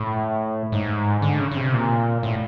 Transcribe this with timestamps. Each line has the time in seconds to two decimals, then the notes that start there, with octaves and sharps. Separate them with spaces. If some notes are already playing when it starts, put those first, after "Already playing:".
Already playing: A2
0.72 G#2
1.22 D3
1.39 C#3
1.52 C#3
1.56 C3
1.73 A#2
2.23 A2